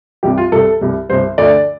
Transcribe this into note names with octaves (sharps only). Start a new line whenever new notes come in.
C2 C3 G3 G4
F4
C2 C3 G3 A4
C2 C3 G3
C2 C3 G3 C5
D2 D3 A3 D5